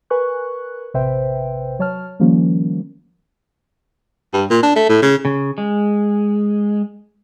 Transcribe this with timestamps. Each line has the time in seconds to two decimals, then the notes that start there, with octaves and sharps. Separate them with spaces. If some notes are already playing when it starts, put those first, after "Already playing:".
0.10 A#4 B4 G#5 C#6 F#6
0.94 A1 C3 B4 C5 E5 G5
1.79 F#3 C#5 A5 F6
2.19 D#3 F3 G3 A#3 C#4
4.33 G2
4.50 A#2
4.63 D4
4.76 A3
4.89 A2
5.02 C#3
5.25 C#3
5.58 G#3